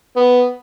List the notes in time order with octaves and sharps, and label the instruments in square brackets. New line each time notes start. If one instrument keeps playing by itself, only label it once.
[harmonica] B3